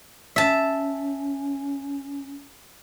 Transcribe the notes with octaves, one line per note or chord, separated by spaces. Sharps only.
C#4 E5 A5